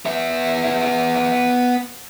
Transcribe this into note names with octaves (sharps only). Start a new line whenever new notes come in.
B3 E5